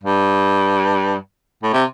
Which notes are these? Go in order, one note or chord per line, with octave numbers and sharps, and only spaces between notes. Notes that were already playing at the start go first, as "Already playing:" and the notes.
G2
A2
C3